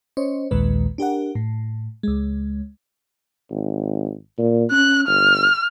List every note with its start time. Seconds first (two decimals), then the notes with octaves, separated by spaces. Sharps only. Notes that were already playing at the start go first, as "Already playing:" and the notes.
0.17 C#4 C5 C#5 D#5
0.51 A#1 D#2 A#2 D#3 G#3 B4
0.98 D4 G4 A#4 F#5
1.35 A2
2.03 C#2 G#3
3.51 G#1
4.38 A#2
4.71 C#4 F#6
5.07 G1 F6